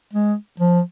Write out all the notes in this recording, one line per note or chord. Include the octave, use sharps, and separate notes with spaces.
G#3
F3